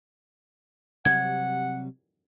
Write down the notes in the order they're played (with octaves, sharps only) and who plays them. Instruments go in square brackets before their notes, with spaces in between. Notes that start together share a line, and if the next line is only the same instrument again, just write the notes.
[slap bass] C3 F#3 G3 [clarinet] F#5 [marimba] G#6